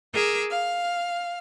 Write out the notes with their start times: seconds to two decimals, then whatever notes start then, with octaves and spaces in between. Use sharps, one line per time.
0.14 G#4 A#4 D6 E6
0.51 F5 F6